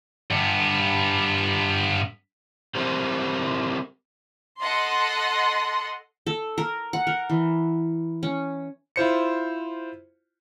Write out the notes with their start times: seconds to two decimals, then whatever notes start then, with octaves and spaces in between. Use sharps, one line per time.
0.30 G2 B3
2.75 C4 G4 A4 A#4 C5
4.60 A4 D#5 F#5 C6
6.27 A4
6.58 A#4
6.93 F#5
7.07 A#4
7.29 E3
8.23 C#4
8.96 E4 F4 C5 C#7